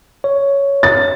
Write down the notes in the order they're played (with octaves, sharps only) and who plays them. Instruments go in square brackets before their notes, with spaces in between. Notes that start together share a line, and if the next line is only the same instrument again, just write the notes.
[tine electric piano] C#5
[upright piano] A6